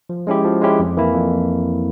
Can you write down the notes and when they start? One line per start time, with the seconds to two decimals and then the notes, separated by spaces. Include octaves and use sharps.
0.09 F3
0.27 G#3 C#4 E4 G4
0.44 F3
0.62 G#3 C#4 E4 G4
0.80 F2
0.97 E3 A#3 E4
1.14 F2